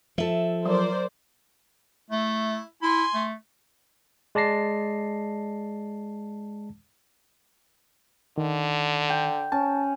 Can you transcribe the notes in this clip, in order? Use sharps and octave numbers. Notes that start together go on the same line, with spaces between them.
F3 A4 E5
F#3 A#4 C5 D5
A3 E4
E4 G#5 C6
A3
G#3 D5 A5 A#6 C7
D3 D#3
G5
C#4 A5